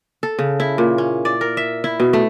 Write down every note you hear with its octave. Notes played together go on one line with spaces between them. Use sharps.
A4
C#3
E4
A#2
C#4
D5
A#4
E5
E4
B2
A3